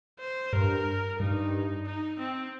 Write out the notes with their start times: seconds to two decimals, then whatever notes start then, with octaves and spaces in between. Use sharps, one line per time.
0.20 C5
0.53 G2 A#4
1.19 G2 D#4
1.86 D#4
2.19 C4